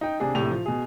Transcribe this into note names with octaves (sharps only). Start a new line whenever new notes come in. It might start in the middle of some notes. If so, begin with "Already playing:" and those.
D#4 G5
C3 D4 G#4
A#1 A2 C3 F7
F3
B2 G#4